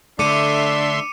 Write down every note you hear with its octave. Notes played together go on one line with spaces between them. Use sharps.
D3 A3 D4 E5 C6 D6 C#7 D#7